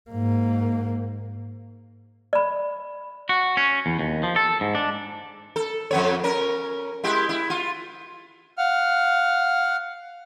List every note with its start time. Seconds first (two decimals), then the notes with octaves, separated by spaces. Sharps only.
0.10 G#2 A#3
2.33 D5 B5
3.29 F#4
3.57 C#4
3.86 E2
3.99 D#2
4.23 F3
4.36 A4
4.61 G#2
4.75 D4
5.56 A4
5.91 F2 B3 C#5
6.24 C#4 A#4
7.04 G#3 E4 G4
7.29 E4
7.50 F4
8.57 F5 F#5 F6